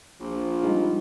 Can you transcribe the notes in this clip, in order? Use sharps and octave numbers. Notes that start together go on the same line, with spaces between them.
A#1 F3
G3 G#3 D#4